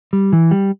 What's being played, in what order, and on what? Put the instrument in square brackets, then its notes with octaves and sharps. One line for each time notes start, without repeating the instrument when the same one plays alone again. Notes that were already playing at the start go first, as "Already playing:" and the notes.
[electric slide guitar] G3
E3
G3